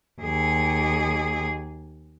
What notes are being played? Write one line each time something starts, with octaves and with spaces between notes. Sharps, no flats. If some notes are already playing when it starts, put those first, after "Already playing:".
D#2 G#4